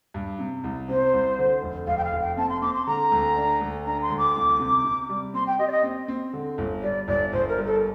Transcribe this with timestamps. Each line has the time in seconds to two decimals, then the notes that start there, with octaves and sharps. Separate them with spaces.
0.14 G2
0.39 C3
0.64 C2
0.89 C3 C5
1.13 C2
1.38 D3
1.62 F1
1.87 F1 F5
1.97 G5
2.04 F5
2.12 F1
2.21 G5
2.37 C4 A5
2.49 C6
2.62 C4 D6
2.74 C6
2.86 D3 A#5
3.12 D2
3.36 D4
3.61 D2
3.86 D4 A#5
4.02 C6
4.10 D2
4.18 D6
4.35 C2
4.59 C3
4.84 C3
5.09 G3
5.34 C4 C6
5.47 G5
5.59 G4 D#5
5.67 D5
5.72 D#5
5.83 C4
6.08 C4
6.33 D3
6.58 G1
6.82 G3 D5
7.08 G1 D5
7.33 G1 C5
7.49 A#4
7.58 G3
7.66 A4